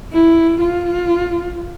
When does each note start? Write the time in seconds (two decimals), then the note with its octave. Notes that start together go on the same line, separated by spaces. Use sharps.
0.13 E4
0.60 F4